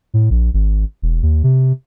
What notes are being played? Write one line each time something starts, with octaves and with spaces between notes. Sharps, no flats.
A2
A#1
G#1
E1
D#2
C3